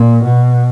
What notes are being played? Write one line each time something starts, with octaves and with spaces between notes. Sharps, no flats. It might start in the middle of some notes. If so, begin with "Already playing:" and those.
Already playing: A#2
B2